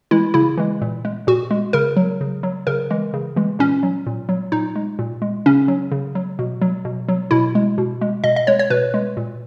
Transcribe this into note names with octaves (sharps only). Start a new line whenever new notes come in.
E3 G#3 E4
C#3 E4
E3 G#3
A#2
G#3
A#2 F#4
G#3
C#3 A#4
F#3
C#3
F#3
C#3 A#4
E3 G#3
C#3
E3 G#3
A#2 C#4
F#3
A#2
F#3
A#2 D#4
G#3
A#2
G#3
C#3 C#4
F#3
C#3
F#3
B2
F#3
B2
F#3
B2 E4
G#3
B2
G#3
B2 D#5
D#5
G#3 C#5
C#5
B2 B4
G#3
A#2